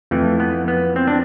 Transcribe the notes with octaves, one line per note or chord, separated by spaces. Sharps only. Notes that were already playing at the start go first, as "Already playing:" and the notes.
F2 E3 A3
B3
B3
C4
D4